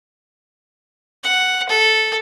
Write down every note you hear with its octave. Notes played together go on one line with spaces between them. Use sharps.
F#5
A4